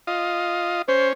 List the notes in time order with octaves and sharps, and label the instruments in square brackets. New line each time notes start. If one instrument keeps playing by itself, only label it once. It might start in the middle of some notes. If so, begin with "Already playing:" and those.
[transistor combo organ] F4 D#5
[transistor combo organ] C#4 [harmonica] C5